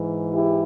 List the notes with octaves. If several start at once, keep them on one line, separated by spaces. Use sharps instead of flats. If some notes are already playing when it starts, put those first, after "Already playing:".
Already playing: G#2 E3
E4 G4